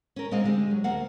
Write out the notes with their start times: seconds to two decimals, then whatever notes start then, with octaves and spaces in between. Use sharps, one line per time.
0.16 C#4 A#4
0.31 A#2 G#3 C4 D#5 F5
0.44 D3 G#3 G4
0.71 F#3
0.84 D2 A#3 F5 F#5